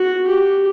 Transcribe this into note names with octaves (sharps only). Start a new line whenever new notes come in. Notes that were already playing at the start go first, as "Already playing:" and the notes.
Already playing: F#4
G4